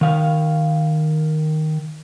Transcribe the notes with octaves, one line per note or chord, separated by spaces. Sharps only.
D#3 F5